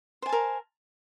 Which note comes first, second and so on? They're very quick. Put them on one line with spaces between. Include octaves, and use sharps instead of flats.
C5 G#5 A5 A#4